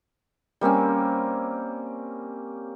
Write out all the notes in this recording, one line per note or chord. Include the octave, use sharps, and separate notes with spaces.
G3 A#3 C4 C#4